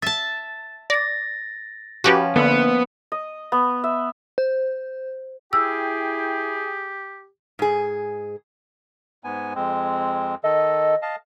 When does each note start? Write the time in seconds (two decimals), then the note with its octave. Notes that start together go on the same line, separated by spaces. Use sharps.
0.02 E5 A5 A6
0.90 D5 A6 A#6
2.04 F3 C#4 F#4 G4 B4
2.36 D3 A#3 B3
3.12 D#5
3.52 B3
3.84 E5
4.38 C5
5.53 E4 G4 G#4 G5 E6
7.59 G#2 G#4
9.24 G#2 B3 G#5
9.55 F2 G#3 C4
10.44 D#3 A4 D#5
11.02 D#5 F5 A5